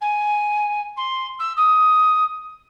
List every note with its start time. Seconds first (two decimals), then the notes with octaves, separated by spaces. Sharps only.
0.01 G#5
0.96 C6
1.39 E6
1.56 D#6